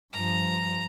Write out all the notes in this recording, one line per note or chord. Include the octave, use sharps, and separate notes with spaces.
G2 F3 A#5